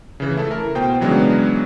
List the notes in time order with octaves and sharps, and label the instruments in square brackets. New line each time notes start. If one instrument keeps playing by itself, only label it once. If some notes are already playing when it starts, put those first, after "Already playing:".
[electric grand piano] C#3 E3
A3 E4 A4
A#4
B2 C5 G5
C#3 E3 F#3 G#3 B3 D4